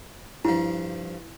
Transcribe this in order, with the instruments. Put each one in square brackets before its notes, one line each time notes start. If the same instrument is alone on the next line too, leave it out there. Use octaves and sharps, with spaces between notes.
[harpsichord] G2 F3 [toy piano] E4